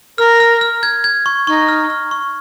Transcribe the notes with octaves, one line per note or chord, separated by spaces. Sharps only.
A#4 F6
F6
F6
G#6
G#6
C#6
D#4 C#6
F6
F6
C#6